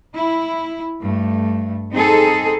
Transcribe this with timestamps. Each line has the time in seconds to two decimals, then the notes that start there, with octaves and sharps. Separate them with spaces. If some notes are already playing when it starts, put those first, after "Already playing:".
0.14 E4
0.99 G2 A3
1.92 C4 D#4 G#4 A4